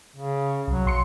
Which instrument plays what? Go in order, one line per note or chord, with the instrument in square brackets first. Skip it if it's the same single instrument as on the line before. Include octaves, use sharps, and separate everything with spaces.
[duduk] C#3
[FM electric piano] C2 [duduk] F#3
[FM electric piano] B1 C6 C#7